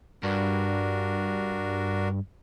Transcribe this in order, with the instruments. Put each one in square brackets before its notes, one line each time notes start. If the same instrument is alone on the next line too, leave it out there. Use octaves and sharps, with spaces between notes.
[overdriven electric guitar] G2 [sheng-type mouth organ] D4 F#4 A#4